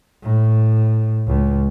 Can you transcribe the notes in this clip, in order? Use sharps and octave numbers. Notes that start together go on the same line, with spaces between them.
A2
C#2